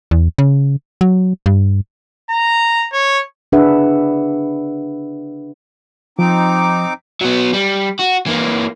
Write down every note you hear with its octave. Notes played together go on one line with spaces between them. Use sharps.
E2
C#3
F#3
G2
A#5
C#5
C#3 D4 G#4 B4 E5 F#5
F3 C4 D#4 D6
F#3 B3
G3
F#4
E3 A#3